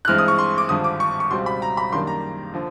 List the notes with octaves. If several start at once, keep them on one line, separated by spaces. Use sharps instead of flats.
F#6
G2 E3 G#3 C4 F6
D#6
C#6
C6
D6
G#1 G2 D3 F3 D#6
D6
C#6
C#6
C#2 B2 G3 C4 C6
B5
A#5
B5
F#2 D#3 G3 A#3 D4 C6
A#5
D3 F3